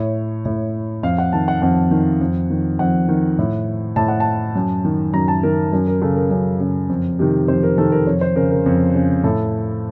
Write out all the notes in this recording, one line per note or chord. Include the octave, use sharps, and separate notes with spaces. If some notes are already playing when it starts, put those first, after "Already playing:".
Already playing: A2 C#5
A2
F2 F5
F#5
D#3 A5
F#5
F2 F#5
D#3
F2
D#3
F2 F#5
D#3
A2
A2 A5
F#5
A5
F#2
D#3
F#2 A#5
A5
D#3 A#4
F#2 A#4
A#4
C#3 A4
A#4
F#2
C#3
F2
C3 D#3
F2 C5
A#4
C3 D#3 A4
A#4
F2 C#5
C5
C#3 A#4
A#4
F2
C#3
A2 A4